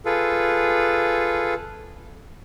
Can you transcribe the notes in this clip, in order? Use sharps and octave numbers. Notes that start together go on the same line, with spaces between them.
F4 G#4 A4 B4